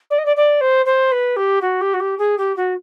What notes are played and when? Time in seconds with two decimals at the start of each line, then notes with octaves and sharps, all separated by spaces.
0.10 D5
0.18 D#5
0.25 D5
0.36 D5
0.61 C5
0.86 C5
1.11 B4
1.36 G4
1.61 F#4
1.81 G4
1.93 F#4
2.00 G4
2.18 G#4
2.38 G4
2.56 F#4